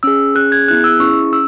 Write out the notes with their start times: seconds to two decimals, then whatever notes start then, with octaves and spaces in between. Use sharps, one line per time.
0.03 C#4 G#4 E6
0.35 C#4 G#4 F#6
0.52 G#6
0.68 B3 E4 G#4 F#6
0.84 E6
1.00 C#4 E4 G#4 C#6
1.32 C#4 E6